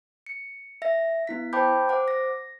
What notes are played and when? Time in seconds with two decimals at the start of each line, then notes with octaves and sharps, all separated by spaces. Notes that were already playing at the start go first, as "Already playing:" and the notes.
0.26 C#7
0.82 E5 A#6
1.27 B3 E4 B6
1.53 C5 G5 A5 B5 D6 G6
1.89 C5 F#5 D6
2.08 A#6